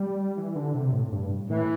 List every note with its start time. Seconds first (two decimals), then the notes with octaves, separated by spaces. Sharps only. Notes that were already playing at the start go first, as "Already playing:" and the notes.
Already playing: G3
0.37 E3
0.56 D3
0.74 C3
0.92 A2
1.12 G2
1.49 A2 E3